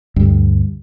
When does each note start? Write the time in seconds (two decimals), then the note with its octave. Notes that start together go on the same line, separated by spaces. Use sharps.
0.16 D2 G2